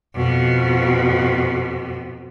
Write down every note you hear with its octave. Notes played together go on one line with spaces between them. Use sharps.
F2 B2